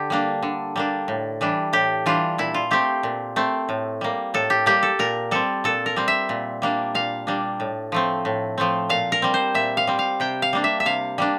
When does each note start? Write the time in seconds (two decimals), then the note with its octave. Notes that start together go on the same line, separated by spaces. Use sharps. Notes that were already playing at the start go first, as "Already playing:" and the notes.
Already playing: D3 G4
0.10 G3 A#3 D4
0.42 D3
0.76 G3 A#3 D4
1.08 A2
1.41 E3 G3 D4
1.73 A2 G4
2.06 E3 G3 D4 F4
2.38 A#2 E4
2.54 F4
2.71 A3 C4 G4
3.03 A#2
3.36 A3 C4
3.69 A2
4.01 G3 A#3
4.34 A2 A4
4.50 G4
4.66 G3 A#3 G4
4.83 A4
4.99 A#2 A#4
5.31 G3 C4 A4
5.64 A#2 A4
5.86 A#4
5.96 G3 C4
6.08 E5
6.29 A#2
6.62 G3 A#3 D4
6.95 A#2 F5
7.27 G3 A#3 D4
7.60 A2
7.92 F3 A3 C4
8.25 A2
8.58 F3 A3 C4
8.89 A#2 F5
9.12 A#4
9.22 G3 C4
9.34 C5
9.54 A#2 E5
9.77 F5
9.87 G3 C4
9.99 F5
10.20 C3 G5
10.42 F5
10.53 G3 A#3 D4
10.64 E5
10.80 E5
10.86 C3 F5
11.18 G3 A#3 D4